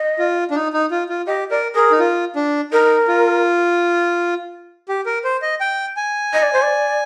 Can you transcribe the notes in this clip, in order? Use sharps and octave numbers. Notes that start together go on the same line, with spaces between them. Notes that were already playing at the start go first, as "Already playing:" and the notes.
Already playing: D#5
F4
D4
D#4
D#4
F4
F4
G4 D#5
A#4 D5
G#4 A#4
D#4
F4
D4
D#4 A#4
F4
G4
A#4
C5
D#5
G5
G#5
D#5
D5
C5
D5